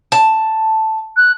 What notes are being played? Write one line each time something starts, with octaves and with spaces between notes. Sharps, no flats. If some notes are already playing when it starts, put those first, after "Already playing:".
A5
F#6